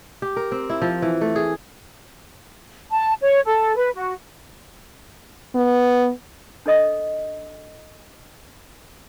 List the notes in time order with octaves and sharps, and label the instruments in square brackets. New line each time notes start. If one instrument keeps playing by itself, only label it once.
[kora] G4
A#4
C4
E4
F3
E3
A3
G#4
[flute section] A5
C#5
A4
B4
F#4
[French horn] B3
[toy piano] D4 A4 D#5 D#6